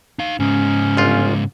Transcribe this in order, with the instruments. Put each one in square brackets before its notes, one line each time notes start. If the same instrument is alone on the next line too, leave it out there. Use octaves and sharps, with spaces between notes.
[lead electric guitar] D#4 F5
[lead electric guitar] G#2 C#3 [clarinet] C#4
[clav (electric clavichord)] G1 F4